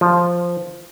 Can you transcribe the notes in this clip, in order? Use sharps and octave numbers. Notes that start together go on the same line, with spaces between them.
F3